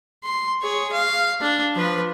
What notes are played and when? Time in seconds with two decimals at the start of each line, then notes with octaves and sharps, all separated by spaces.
0.24 C6
0.62 G#4 C#5
0.93 F5
1.41 D4
1.75 F3 B4